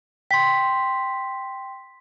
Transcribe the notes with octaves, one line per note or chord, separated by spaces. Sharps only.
G5 C6 B6